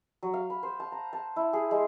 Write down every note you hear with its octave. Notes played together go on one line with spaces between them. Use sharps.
F#3
F5
B5
C5
A5
A#5
A5
E4
G#4
G#3